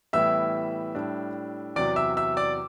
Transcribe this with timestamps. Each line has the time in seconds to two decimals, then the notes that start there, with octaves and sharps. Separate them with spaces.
0.13 A2 E3 G3 B3 E4 E5 E6
0.95 A2 G3 D4
1.76 E2 C3 F#3 D5 D6
1.96 E5 E6
2.17 E5 E6
2.37 D5 D6